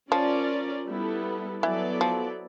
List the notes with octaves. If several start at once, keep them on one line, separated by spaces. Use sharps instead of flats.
F3 C#4 F4 A#4 D5
G3 B3 E4 A4
E3 F#3 B3 E4 A4 D5
F3